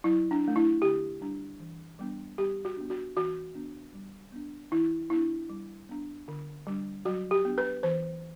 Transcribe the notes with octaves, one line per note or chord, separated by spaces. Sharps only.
F#3 E4
D4
A3 D4
E4
D3 G4
G3 D4
E3
G3 B3 D4
G3 G4
F#4
B3 D4
F#4
E3 F#4
B3 D4
G3
B3 D4
E3 E4
B3 D4 E4
G3
B3 D4
D3
G3 D4
F#3 F#4
G4
B3 D4
B4
E3 C5